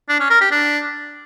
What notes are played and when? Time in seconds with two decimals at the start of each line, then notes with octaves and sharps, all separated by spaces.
0.09 D4
0.20 C#4
0.30 A#4
0.41 G4
0.51 D4